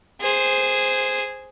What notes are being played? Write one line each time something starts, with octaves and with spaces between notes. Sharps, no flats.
G#4 C5